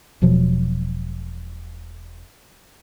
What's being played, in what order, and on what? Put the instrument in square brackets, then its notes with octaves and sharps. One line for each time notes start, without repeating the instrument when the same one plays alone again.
[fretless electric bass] E1 B2 F3 F#3